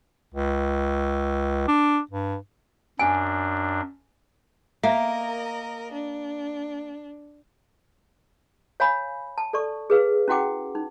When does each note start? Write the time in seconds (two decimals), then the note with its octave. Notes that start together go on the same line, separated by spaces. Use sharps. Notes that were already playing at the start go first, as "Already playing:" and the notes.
0.34 C#2
1.68 D4
2.11 G2
2.99 F#2 D4 G#5
4.83 A#3 A#4 D#5 E5
5.92 D4
8.80 C#5 F5 G#5 B5
9.38 A5
9.53 A4 D5 C#6
9.90 G#4 B4 F5
10.28 C#4 E4 F#4 F#5 G5 D6
10.75 D#4